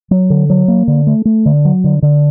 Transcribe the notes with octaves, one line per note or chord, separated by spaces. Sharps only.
F#3
D3
F#3
A#3
D3
A3
A3
D3
F#3
D3
D3